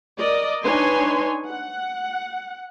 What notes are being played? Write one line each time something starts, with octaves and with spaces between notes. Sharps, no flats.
A#4 D5 D#5
D4 D#4 B4 C#5 G#5 C6
F#5